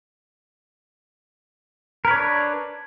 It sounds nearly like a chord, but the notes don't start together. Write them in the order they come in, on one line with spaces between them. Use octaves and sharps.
A#4 B4 C#5 D4